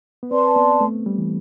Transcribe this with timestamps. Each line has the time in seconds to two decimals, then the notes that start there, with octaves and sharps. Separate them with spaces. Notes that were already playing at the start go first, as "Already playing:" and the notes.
0.23 B3
0.31 C4 B4 D5 A5 C6
0.56 B3
0.81 A3
1.06 G3
1.18 E3